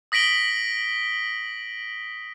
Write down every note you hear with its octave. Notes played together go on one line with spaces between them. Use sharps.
D#6 A#6 B6 D7 F#7 G7